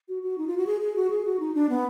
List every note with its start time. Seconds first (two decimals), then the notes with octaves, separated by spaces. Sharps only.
0.09 F#4
0.23 F#4
0.38 D#4
0.48 F4
0.57 F#4
0.67 G#4
0.81 G#4
0.96 F#4
1.10 G#4
1.25 F#4
1.40 D#4
1.55 D4
1.69 B3